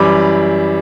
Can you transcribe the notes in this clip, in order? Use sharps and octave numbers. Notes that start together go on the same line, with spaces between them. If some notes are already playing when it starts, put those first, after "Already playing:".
Already playing: F#2 E3 G3 B5 D6